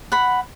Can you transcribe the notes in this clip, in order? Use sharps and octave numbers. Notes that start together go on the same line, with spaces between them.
F#5 B5